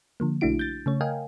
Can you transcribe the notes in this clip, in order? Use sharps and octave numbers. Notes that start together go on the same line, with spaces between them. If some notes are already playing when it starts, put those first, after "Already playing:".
D3 F3 A#3
B1 A3 D4 E4 F#4 D7
G6 A6
C#3 A3 C#5
A#4 D#5 F5 G5 G#5